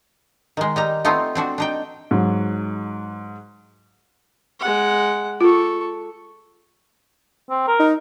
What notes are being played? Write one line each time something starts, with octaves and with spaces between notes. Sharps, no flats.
D#3 G#3
G3 D#4 A#5
A3 B3 C4 D#4 F4
C4 D4 F#4
D4 D#4 G5
G#2 F#3
G#3 F#5
F4 A4 C#6
C4
A#4
D#4